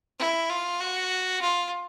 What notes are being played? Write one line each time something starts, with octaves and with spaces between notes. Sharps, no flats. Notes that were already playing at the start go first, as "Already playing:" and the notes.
E4
F4
F#4
F4